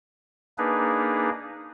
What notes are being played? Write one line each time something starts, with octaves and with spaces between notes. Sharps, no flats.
A#3 D4 D#4 G#4 B4